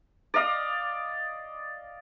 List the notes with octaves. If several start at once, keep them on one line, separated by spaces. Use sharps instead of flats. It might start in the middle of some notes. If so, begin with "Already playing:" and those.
D5 D#5 F5 D#6